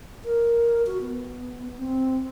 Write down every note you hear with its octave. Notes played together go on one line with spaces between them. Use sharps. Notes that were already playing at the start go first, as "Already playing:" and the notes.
A#4
F#4
B3
C4